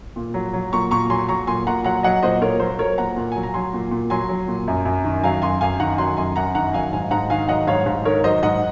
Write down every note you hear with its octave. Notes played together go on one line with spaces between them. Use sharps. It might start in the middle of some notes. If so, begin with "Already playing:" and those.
A#2
F#3
F#3
A#2 A#5 C#6
A#2 A#5 C#6
F#3 G#5 C6
F#3 A#5 C#6
A#2 G#5 C6
A#2 F#5 A#5
F#3 F#5 A#5
F#3 D#5 F#5
A#2 C5 D#5
A#2 A#4 C#5
F#3 C5
F#3 A#4 C#5
A#2 F#5 A#5
A#2
F#3 G#5
A#5
F#3 G#5 C6
A#2
A#2
F#3 G#5 C6
F#3
A#2
F#2
F#2
D#3
F#3 F5 G#5
F#2 G#5 C6
F#2 F5 G#5
D#3 F#5 A#5
F#3 G#5 C6
F#2 G#5 C6
F#2 F#5 A#5
D#3 F#5 A#5
F#3 F5 G#5
G#2 F5 G#5
G#2 F#5 A#5
D#3 F5 G#5
F#3 D#5 F#5
G#2 C#5 F5
G#2
D#3 A#4 C#5
F#3 C5 D#5
G#2 D#5 F#5